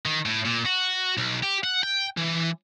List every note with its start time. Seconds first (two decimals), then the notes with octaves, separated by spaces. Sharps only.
0.05 D#3
0.26 A2
0.45 A#2
0.66 F#4
1.17 B1
1.43 G4
1.64 F#5
1.83 G5
2.18 E3